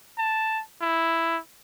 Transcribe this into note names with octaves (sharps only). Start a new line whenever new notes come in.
A5
E4